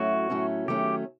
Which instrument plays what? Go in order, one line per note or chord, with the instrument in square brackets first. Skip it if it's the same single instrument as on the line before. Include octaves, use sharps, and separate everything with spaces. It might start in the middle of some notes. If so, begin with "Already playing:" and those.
Already playing: [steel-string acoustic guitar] A2 F#3 A3 C#4 [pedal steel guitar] F#4
[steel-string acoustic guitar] A2 F#3 A3 C#4
[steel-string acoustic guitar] D#3 F#3 A3 C#4 [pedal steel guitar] G4